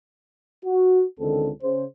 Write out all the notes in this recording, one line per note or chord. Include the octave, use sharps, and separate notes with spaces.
F#4
C#2 D3 D#3 C4 A4
C#3 C5